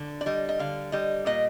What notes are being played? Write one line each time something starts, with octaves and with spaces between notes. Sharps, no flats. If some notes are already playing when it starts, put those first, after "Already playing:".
Already playing: D3
D5
G3 D#5
D#5
D3 F5
G3 D#5
A#2 D#5